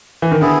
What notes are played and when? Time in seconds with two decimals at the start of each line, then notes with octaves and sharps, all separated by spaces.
0.22 E3
0.31 D#3
0.41 D3 B3 E4 G#4